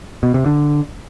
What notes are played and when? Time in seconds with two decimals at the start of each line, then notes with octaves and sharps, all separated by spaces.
0.23 B2
0.34 C3
0.46 D3